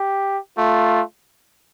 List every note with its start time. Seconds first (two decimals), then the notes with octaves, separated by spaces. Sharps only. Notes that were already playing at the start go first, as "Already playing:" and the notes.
Already playing: G4
0.58 A3 F4